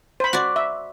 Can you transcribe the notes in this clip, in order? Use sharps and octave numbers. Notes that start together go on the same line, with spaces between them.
C5 B5
F#4 D5
E5